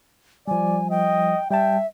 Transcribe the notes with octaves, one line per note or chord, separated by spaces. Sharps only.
F3 G3 D5 G#5
D#5 G5
G3 E5 G5 A5